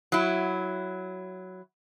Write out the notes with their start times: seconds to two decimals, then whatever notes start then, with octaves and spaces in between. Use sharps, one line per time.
0.12 F#3 E4